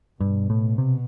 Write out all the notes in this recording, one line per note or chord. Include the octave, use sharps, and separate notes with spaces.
G2 B2
A2
C3